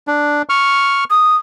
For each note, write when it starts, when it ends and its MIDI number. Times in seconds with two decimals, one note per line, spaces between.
0.08 0.42 62
0.49 1.04 85
0.49 1.04 89
1.10 1.36 87